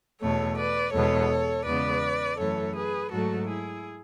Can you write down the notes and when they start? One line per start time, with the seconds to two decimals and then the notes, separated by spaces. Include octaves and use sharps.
0.21 E2 B2 A3 A4 C#5
0.58 B4 D5
0.94 E2 B2 G#3 B3 A4 C#5
1.66 E2 C#3 G#3 B3 B4 D5
2.39 F#2 E3 A3 A4 C#5
2.75 G#4 B4
3.11 G#2 F#3 A3 F#4 A4
3.47 E4 G#4